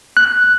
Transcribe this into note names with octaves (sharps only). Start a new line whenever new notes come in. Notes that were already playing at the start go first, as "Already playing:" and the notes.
F#6